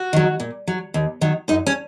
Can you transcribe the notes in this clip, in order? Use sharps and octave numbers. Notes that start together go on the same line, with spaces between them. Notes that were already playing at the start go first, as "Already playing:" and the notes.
Already playing: F#4
D#3 F#3
A#2
F#3
D#2
D#3 F#3
F#2 D#4
C#4